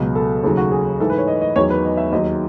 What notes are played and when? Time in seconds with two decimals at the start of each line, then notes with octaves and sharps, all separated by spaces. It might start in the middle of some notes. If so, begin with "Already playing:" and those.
Already playing: C#2 B2 F#3
0.15 A4
0.43 D#2 C#3 F#3 A4
0.57 F#4
0.72 G#4
1.00 G#2 E3 A4
1.10 B4
1.18 C#5
1.27 D#5
1.42 D#5
1.56 E2 D#3 F#3 C#5
1.70 B4
1.85 D#5
1.97 E5
2.12 D#2 D#3 F#3 D#5